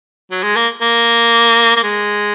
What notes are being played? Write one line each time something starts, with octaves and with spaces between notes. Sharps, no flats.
F#3
G#3
A#3
A#3
A#3
G#3